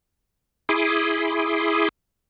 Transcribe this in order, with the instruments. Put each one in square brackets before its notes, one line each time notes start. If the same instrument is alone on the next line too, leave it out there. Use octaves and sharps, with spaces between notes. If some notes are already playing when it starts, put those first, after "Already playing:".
[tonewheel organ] E4 G#4 B5 C6 D6 D#6